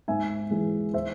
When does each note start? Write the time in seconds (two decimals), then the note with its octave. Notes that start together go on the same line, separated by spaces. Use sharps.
0.08 G#2 E5 G#5
0.51 E3 G#3
0.94 C5 E5